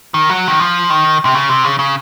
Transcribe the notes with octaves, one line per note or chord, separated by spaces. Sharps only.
D#3
F#3
D#3
F3
D#3
C3
C#3
C3
C#3
C#3